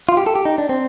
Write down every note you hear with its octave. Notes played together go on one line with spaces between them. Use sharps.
F4
G4
A4
G4
D#4
D4
C4